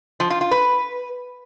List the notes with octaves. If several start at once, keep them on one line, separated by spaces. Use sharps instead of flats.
F3
F4
F4
B4